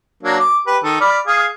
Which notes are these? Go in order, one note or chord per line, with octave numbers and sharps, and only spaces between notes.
F#3 A#3 D4
D6
G4 B4
D#3 A4
D5 B5 F6
G#4 F5 F6